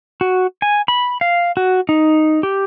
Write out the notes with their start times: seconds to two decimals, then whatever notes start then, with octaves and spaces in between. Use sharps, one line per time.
0.21 F#4
0.62 G#5
0.88 B5
1.21 F5
1.57 F#4
1.89 D#4
2.43 G4